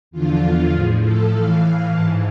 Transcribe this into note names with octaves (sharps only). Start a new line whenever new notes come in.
E2 D3 F3 F4
A2 F3 G#4
A4
A2 E3 F5
G#2 E3 A5